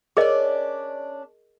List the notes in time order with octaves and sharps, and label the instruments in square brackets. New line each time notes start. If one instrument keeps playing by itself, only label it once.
[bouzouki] C#4 D4 D5 [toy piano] G#4 A#4 D#5